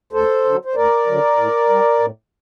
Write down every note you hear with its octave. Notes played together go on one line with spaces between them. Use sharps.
D2 A4 C5
D3 F#3
C5
D2 A#4 D5
D3 F#3
A2
G3
A2